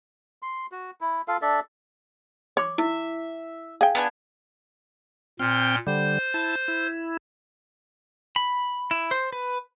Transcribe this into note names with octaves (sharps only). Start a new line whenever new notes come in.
C6
F#4
E4
F4 A4 F5
D4 A4 D5 E5
C#5 C6 D6
E4 E5
G#4 F5 G5
B3 D4 G#5
A#2 C4 G5 F6 G6
D3 G3 C5
E4 A5
E4
B5
E4
C5
B4